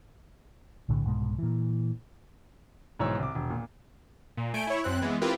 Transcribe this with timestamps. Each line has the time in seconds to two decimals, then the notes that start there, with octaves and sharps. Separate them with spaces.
0.89 B1 A2 D3
1.05 C2 G#2 B2 G#3
1.39 A#2 E3
2.99 B1 G#2 E3 C#5 E6
3.19 C2 D6
3.35 E1
3.50 A#2
4.37 A#2
4.54 A3 G#5 G6 D7
4.67 E4 C#5
4.84 F#2 C4 F#6
5.02 E3 G#3 B3
5.21 C4 E4 F4 G4 A#4 B4